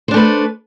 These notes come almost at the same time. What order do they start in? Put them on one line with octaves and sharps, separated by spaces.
C5 D4 A3 B4